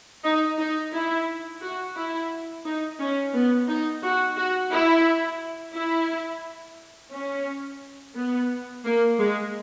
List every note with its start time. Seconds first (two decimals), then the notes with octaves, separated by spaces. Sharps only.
0.24 D#4
0.58 D#4
0.93 E4
1.62 F#4
1.96 E4
2.65 D#4
3.00 C#4
3.34 B3
3.68 D#4
4.03 F#4
4.36 F#4
4.71 E4
5.74 E4
7.12 C#4
8.16 B3
8.84 A#3
9.19 G#3